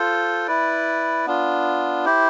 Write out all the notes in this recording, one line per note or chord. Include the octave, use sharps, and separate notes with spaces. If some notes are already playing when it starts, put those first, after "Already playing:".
Already playing: F4 A4 C5
E4 B4 D5
B3 D4 F4
E4 G4 C5